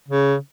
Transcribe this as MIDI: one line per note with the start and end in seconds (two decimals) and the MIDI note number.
0.08 0.36 49